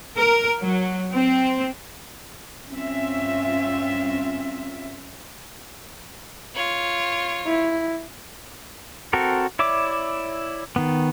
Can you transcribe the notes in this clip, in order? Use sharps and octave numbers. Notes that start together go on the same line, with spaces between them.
A#4
F#3
C4
G2 C4 C#4 F4 E5
F4 C#5
E4
C4 F#4 A4 A#4
E4 C#5 D5 E5 D6
D#3 B3